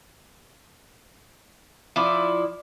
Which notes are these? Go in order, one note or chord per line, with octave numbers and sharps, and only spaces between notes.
F3 E4 D5